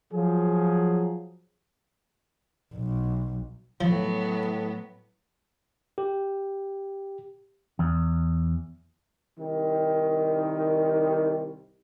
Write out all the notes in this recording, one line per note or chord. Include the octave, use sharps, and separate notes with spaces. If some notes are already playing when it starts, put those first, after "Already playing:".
F3 F#3 G#4
B1
A2 F3 F#3 B3
G4
E2
C2 D#3